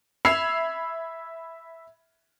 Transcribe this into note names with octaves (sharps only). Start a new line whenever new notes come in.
E5 B5 E6 G#6 C7 F7